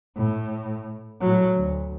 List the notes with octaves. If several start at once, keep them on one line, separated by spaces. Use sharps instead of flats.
A2
A2 F#3
D2